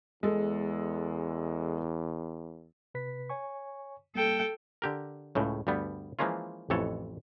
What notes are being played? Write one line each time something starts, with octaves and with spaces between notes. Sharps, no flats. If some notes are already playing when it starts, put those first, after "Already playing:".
E2 G#3 A4
C3 B4 B6
C#5 G#5 C#6
G3 A#3 A4 G5
D3 G4 A#4
C#2 A2 C#3
D2 G2 G3 B3
E3 F3 G#3 A#3 C#4 F4
A1 F2 E3 A4 C#5